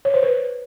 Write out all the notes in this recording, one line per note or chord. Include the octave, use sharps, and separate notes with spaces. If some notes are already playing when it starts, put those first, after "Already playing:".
C#5
C5
B4